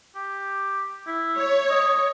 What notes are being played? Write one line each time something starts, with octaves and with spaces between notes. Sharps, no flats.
G4
E4
C#5
D#5